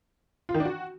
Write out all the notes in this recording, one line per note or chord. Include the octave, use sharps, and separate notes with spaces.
F4
D#3
D4
F#4